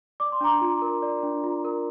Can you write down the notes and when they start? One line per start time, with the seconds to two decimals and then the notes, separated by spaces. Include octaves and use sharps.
0.20 D5 D6
0.32 C6
0.41 D4 A#5 D6
0.61 F4
0.82 A#4
1.02 D5
1.23 D4
1.44 F4
1.65 A#4